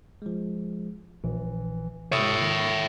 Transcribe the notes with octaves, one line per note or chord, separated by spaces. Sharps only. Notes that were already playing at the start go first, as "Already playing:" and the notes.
F3 G#3
A#1 E3
C3 C#5 E5 C#6 D#6 E6
D#3